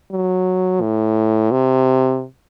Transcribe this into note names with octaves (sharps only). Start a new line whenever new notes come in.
F#3
A2
C3